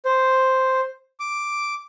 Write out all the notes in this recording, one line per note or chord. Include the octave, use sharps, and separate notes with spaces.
C5
D6